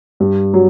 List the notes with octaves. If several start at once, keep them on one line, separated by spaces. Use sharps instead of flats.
G2
F#3